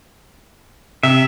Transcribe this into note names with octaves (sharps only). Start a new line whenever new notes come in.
C3 E5